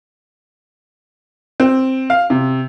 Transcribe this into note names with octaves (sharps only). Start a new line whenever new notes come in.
C4
F5
C3